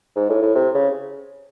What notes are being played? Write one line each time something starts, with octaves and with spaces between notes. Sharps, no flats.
G#2
A2
A2
C3
C#3